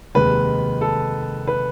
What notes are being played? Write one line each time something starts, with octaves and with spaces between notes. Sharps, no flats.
F1 D#2 D#3 G#3 B4
A4
B4